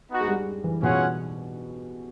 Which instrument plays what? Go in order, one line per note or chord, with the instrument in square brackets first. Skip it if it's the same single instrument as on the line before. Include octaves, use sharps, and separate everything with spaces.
[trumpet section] B3 D#4 F#4
[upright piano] G#3
G3
E3
[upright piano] B2 [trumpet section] C#4 F4 G#4 C#5 F#5